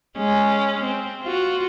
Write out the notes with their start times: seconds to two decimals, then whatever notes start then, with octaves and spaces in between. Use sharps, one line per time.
0.17 G#3 C#4
0.85 C4
1.23 F4 F#4